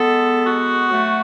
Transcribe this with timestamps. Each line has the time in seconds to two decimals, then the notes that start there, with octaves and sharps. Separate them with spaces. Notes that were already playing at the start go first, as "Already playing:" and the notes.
Already playing: G#3 B3 A4
0.47 F#4
0.90 F#3 A3